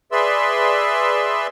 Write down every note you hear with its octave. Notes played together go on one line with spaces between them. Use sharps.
G#4 B4 D5 E5 C6 E6